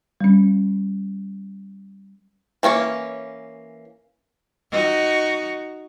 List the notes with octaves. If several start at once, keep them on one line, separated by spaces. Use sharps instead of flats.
G3 C#4
E3 A#3 C#4 C#5
D#4 F#4